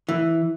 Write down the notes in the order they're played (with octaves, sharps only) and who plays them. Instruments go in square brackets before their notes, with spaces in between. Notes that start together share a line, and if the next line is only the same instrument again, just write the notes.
[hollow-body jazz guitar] E3